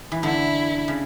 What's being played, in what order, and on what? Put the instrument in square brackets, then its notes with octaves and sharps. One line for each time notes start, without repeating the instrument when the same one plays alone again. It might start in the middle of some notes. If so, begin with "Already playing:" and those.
[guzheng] E3
[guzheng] D3 [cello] E4
[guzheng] C#3